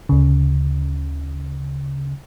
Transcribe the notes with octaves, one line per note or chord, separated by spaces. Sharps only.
D2 C#3